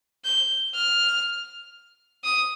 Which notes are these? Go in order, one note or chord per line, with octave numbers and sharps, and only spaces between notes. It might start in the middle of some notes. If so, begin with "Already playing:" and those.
G6
F6
D#6